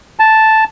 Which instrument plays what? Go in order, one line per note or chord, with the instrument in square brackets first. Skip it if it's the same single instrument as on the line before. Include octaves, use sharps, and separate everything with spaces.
[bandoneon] A5